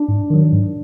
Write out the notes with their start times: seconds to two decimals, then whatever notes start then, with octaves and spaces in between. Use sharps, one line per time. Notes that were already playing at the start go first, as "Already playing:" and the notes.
Already playing: D4
0.09 G#2
0.30 D#3 F#3
0.52 G#2